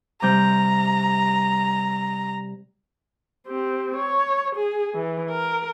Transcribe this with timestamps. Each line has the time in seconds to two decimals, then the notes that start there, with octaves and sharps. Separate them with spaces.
0.22 C3 G3 A#5 G6
3.47 C4 G4
3.96 C#5
4.56 G#4
4.94 E3
5.30 A#4